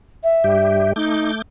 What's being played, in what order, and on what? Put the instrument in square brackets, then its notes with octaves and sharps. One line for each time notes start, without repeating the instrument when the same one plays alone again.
[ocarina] E5
[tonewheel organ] G2 G3 G4
[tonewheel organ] A3 D6 G6 [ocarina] D#4